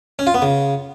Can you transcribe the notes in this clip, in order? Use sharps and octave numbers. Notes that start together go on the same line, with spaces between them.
C#4
F4
B3
C#3